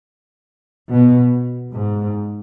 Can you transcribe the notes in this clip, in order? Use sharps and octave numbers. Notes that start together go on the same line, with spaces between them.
B2
G#2